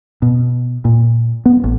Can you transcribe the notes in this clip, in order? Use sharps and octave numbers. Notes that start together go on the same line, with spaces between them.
B2
A#2
B3
A1